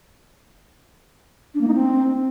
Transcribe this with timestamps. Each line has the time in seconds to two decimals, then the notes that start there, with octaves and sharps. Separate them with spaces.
1.55 D4
1.61 A#3
1.68 D#4
1.74 C4